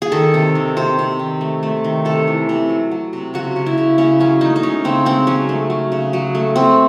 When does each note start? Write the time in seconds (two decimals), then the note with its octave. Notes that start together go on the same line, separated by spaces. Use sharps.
0.02 G#4
0.12 D#3 A4
0.34 C3
0.55 D#3
0.77 C3 C5
0.99 C3
1.19 D#3
1.41 A3
1.63 A3
1.84 D#3
2.05 C3 A4
2.27 E3
2.49 C3
2.69 F#3
2.91 F#3
3.13 C3
3.34 C#3 F#4
3.56 C#3
3.66 E4
3.78 C#3
3.98 C#3 C#4
4.19 F#3 C#4
4.41 A3 D#4
4.56 D#4
4.63 G#3 C#4
4.84 C#3 C4
5.05 G#3 C4
5.27 F#3 C#4
5.49 A3
5.70 F#3
5.92 C#3
6.13 F#3
6.35 A3
6.56 A3 C4